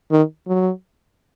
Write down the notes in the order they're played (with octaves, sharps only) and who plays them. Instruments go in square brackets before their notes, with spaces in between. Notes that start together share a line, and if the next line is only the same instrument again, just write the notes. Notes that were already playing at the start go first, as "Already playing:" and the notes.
[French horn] D#3
F#3